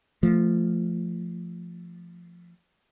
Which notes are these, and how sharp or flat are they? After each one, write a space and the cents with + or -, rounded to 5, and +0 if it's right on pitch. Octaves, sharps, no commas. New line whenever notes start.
F3 -10 A3 +10